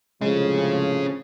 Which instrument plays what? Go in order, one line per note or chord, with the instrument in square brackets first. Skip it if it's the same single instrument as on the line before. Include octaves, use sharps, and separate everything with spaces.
[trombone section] A2 C3 F3 [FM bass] G#3 [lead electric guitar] C#4 G#4